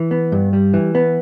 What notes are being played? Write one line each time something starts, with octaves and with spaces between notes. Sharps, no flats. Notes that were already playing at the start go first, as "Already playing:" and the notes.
Already playing: E3
B3
G2
G3
E3
B3